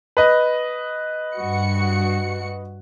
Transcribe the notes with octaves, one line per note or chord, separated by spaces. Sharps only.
B4 D#5
G2 F#4 C#7